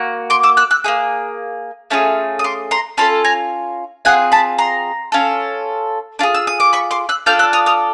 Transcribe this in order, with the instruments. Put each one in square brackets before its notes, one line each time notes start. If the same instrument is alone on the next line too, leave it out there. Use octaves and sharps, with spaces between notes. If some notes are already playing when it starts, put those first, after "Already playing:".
Already playing: [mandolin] A#3 F#4
C6 D6
D6 E6
E6 F#6
E6 F#6
A#3 D#4 G#4
A3 C#4 F4 G#4
D#6
C6 D6
A#5 C6
C#4 F4 A4 A5 B5
G#5 A#5
C4 F4 G#4 F#5 G#5
A5 B5
A#5 C6
C#4 F4 A4
D4 F4 G#4
E6
D#6
D6
B5 C#6
C6 D6
E6 F#6
D4 F4 A4 F6 G6
E6 F#6
D#6 F6
D#6 F6